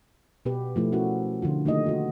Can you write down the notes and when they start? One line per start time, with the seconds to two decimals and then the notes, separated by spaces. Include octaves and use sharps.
0.45 B2 B3 G4 B4
0.76 F3 A3 E4
0.92 C#4 E4 F#4 A#4
1.42 D3 F3 F4
1.65 D#3 A3 A#3 D#4 G4 D#5
1.84 B3 F4 F#4